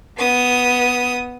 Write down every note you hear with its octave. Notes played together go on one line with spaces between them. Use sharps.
B3 D#6